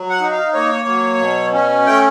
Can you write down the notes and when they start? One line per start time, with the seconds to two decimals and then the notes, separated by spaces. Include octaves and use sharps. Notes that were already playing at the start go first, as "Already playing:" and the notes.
Already playing: F#3
0.10 F#5
0.20 D#4
0.31 F5
0.53 A#3 C#5
0.87 F#3
1.20 B2
1.53 C#4
1.86 A3 G5